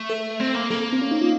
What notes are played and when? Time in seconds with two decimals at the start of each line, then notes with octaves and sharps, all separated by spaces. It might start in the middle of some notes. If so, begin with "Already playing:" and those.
Already playing: A3
0.10 A4
0.40 C4
0.55 A#3
0.70 A#3 A4
0.92 C4
1.02 C#4
1.11 D#4
1.21 F4